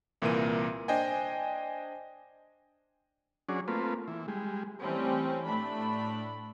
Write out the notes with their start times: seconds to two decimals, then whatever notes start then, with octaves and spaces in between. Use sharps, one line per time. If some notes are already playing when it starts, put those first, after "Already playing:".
0.22 C2 A#2 E3 A#3 A#4 D#7
0.88 D4 C5 D#5 G5 G#5
3.49 F#3 C#4 D4 G#4
3.68 A3 A#3 C4 F4 B4
4.08 E3
4.28 G3 G#3
4.82 E3 G3 A3 C4 C#4
5.46 A2 A3 D4 B5